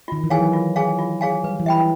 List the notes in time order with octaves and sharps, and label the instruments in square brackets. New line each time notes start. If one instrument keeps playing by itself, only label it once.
[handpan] D#3 [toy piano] F4
[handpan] E3
[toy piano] G#4 C#5 F5 G#5
[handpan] F#3
[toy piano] F4
G#4 C#5 F5 G#5
F4
G#4 C#5 F5 G#5
[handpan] G3 [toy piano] B4
[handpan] E3
[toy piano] E5 G5 B5